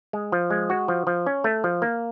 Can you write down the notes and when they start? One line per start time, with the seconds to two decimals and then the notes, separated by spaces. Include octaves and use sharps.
0.13 G#3
0.32 F3
0.50 G#3
0.70 F#4
0.88 F3
1.07 F3
1.26 C#4
1.44 A3
1.64 F3
1.82 A#3